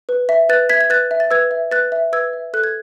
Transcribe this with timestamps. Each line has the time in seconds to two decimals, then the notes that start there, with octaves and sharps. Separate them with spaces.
0.09 B4
0.29 E5
0.49 B4 F#6 A6
0.69 E5 G#6 B6
0.81 G#6
0.90 B4 F#6 A6
1.11 E5
1.20 A6
1.31 B4 E6 G#6
1.51 E5
1.71 B4 F#6 A6
1.92 E5
2.13 B4 E6 G#6
2.33 E5
2.54 A4 F#6
2.64 G#6